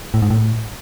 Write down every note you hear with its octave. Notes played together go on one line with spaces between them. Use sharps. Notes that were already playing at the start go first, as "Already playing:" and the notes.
A2
G#2
A2